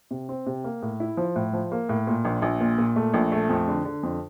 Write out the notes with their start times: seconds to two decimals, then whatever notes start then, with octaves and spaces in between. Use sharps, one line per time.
0.11 C3
0.29 C4
0.46 C3
0.64 A#3
0.82 A2
1.00 E4
1.17 F3
1.36 A2
1.53 F3
1.72 A#3
1.89 A2
2.07 A#2
2.25 A#1
2.42 A#1
2.60 A#2
2.78 A#2
2.96 A3
3.14 A#1
3.32 A3
3.49 F2
3.68 D3
3.85 D3
4.03 F2